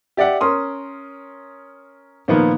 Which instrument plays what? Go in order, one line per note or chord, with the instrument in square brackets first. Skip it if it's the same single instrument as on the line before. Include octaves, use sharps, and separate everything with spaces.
[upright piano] G4 D5 E5 F#5
C#4 A#4 C6 D#6
A#2 D#3 F3 A#3 B3